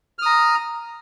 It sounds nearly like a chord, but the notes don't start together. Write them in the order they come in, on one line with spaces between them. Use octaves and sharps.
F6 D#6 A#5